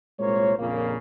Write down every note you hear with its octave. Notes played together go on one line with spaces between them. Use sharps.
C2 A#2 G#3 A#3 C5 C#5
A#1 F2 A#2 C#3 A#3